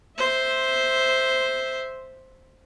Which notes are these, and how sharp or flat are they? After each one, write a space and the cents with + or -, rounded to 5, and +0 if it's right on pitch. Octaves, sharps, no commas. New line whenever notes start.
C5 +0 E5 -10